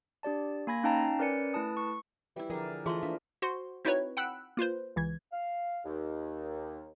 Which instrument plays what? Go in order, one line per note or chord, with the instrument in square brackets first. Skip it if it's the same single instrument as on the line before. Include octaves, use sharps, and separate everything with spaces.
[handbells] D4 G4 D5 A5
A#3 G#5 B5 G#6 A#6
C#4 D#4 F5 G5 A5 A#5
C#4 A#4 B4 D5 G#5 C#7
A3 E4 B4 A5 D#6
C#6
[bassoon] E3 [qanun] G3 E4
[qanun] D3 G#4 [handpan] F3 A#4 D5
[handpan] E3 [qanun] F3 D#5 [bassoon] A3 [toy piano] G#4 E5 C6
[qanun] A#3 [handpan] D4 [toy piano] F5
[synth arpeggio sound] F#4 C5 C6
C4 D#4 E4 F#4 B4 C#5
F#5 G5 B5 E6 F#6
A#3 F4 B4 C5
C#2 E3 G#6
[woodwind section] F5
D#2